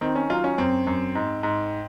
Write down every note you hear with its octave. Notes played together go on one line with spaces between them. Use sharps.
D#3 C4
C#4
F#3 F4
C#4
F#2 C4
F#2
G#2
G#2